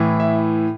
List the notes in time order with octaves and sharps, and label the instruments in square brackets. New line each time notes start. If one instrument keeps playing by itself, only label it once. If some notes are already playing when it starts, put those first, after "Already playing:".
Already playing: [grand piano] A2 E3
E5